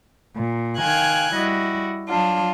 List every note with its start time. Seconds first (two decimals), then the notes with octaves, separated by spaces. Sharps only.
0.35 A#2
0.79 D#3 F5 G5 G#5 F#6 G#6
1.34 G3 E4 F#4 D#5
2.08 F#3 D4 F4